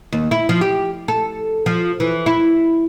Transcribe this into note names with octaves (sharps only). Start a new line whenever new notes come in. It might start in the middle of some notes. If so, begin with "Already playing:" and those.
D#2
E4
F3
G4
A4
F3
E3
E4